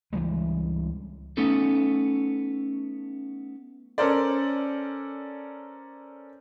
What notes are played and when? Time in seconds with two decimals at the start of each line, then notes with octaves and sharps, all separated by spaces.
0.13 C#2 E3 G3 G#3
1.37 A3 B3 C#4 D#4 A4
3.98 C#4 A4 A#4 C5 D5